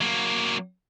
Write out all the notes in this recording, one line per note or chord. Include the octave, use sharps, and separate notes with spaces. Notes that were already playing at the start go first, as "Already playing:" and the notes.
F#3 A#3